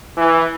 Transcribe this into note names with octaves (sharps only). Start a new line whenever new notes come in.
E3